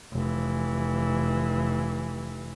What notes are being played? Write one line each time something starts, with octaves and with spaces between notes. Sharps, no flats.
F1 E3